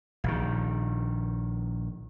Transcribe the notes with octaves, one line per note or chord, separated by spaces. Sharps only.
A#1 D#3